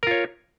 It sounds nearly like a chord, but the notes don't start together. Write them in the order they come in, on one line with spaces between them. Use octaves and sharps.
A#4 F4 C#5